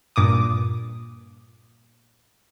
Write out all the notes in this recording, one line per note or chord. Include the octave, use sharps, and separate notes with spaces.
G2 A#2 D6 D#6